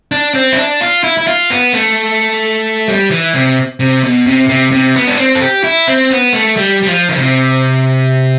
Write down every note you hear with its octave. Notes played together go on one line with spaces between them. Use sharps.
D4
C4
E4
D4
F4
E4
E4
F4
B3
A3
G3
E3
C3
C3
B2
C3
C3
C3
B3
D4
C4
A4
G4
E4
C4
B3
A3
G3
G3
F3
D3
C3